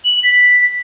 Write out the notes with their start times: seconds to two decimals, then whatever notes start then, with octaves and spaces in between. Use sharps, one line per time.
0.05 F#7
0.23 B6